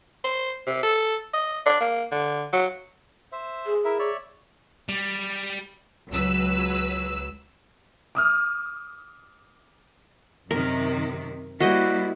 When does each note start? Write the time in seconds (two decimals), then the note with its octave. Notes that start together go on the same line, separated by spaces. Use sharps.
0.24 C5
0.67 C3
0.83 A4
1.34 D#5
1.66 D4
1.80 A#3
2.12 D3
2.53 F#3
3.32 C5 E5
3.66 G#4
3.85 E4 A#4 E5
3.99 C#5 D5 E5
4.89 G3
6.11 C#2 F#3 B4 E6
8.15 D6 D#6 F6
10.51 F#2 C3 D#3 A#4
11.60 G3 A#3 E4 F#4 C5 D#5